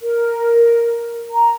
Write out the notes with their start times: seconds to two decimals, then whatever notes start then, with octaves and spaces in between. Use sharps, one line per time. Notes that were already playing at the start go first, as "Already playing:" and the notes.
0.01 A#4
1.31 A#5